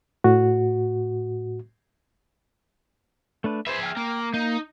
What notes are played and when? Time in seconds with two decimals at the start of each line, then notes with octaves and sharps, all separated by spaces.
0.24 A2 F#4
3.44 A3 D4 B4
3.67 G#4 B4 C5 E5
3.83 G5 F6
3.97 A#3
4.34 A#3 D#4